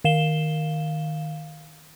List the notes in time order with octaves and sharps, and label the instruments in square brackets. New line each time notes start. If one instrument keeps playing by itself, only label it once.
[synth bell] D#3 F5 E7 G7